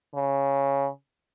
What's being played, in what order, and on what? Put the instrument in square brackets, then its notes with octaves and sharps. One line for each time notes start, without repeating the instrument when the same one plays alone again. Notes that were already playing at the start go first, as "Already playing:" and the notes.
[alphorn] C#3